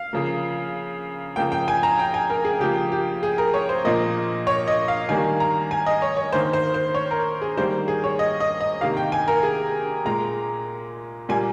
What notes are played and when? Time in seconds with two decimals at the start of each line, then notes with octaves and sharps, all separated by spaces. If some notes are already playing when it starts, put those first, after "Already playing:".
Already playing: F5
0.13 C#3 F3 A#3
1.36 C#3 F3 A#3 G5
1.52 G5
1.68 G#5
1.83 A#5
1.99 G5
2.14 G#5
2.30 A#4
2.45 G#4
2.60 C#3 F3 A#3 G4
2.92 G4
3.23 G#4
3.38 A#4
3.54 C#5
3.69 C5
3.85 A#2 F3 A#3 D#5
4.47 C#5
4.68 D#5
4.88 F5
5.09 D#3 G3 A#3 G#5
5.40 A#5
5.71 G#5
5.86 D#5
6.02 C#5
6.17 C#5
6.33 D#3 A#3 C5
6.53 C5
6.74 C5
6.94 C#5
7.11 A#4
7.42 G#4
7.57 D#3 G3 A#3 C5
7.88 G#4
8.04 C#5
8.19 D#5
8.40 D#5
8.61 D#5
8.81 C3 D#3 A#3 F5
8.97 G5
9.12 G#5
9.28 A#4
9.43 G#4
10.05 A#2 G#3 A#5
11.29 A#2 G3 A#3 G#5